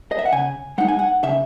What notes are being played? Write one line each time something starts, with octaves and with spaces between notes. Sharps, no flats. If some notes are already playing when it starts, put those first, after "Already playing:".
D#5
E5
F#5
C#3 G#5
G#3 D#4 F#5
G#5
F#5
C#3 E5